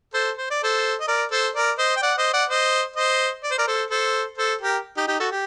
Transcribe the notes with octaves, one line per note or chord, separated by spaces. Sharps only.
A4 C5
C5
D5
A4 C5
D#5
A#4 D5
A4 C5
A#4 D5
C5 D#5
G5
D5 F#5
C5 D#5
D5 F#5
C5 D#5
C5 D#5
D5
C5
A#4 D5
A4 C5
A4 C5
A4 C5
G4 A#4
D#4 G4
D#4 G4
F#4 A4
G4